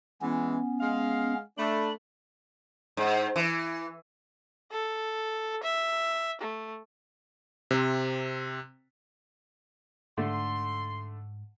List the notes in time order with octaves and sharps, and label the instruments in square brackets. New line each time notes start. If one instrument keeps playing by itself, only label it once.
[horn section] E3 G#3 [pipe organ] B3 C#4
[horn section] G#3 F5
[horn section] A3 D4 [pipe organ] B5
[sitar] G#2
E3
[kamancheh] A4
E5
A3
[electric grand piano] C3 C4
[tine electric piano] G#2 [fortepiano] D3 A3 [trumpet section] C6